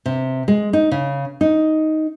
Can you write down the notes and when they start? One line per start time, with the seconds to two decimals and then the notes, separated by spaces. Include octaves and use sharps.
0.06 C3
0.48 G#3
0.73 D#4
0.91 C#3
1.41 D#4